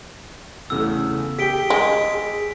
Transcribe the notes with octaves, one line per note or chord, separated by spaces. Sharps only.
E2 C#3 A3 E6
G4 G#4 G5 B6 D7 G7
G#3